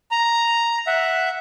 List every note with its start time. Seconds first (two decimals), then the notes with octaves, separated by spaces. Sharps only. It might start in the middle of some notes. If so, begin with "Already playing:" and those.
0.11 A#5
0.87 E5 F#5